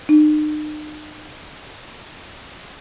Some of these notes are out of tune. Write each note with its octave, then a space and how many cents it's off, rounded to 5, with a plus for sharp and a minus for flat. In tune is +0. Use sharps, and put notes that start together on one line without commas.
D#4 -40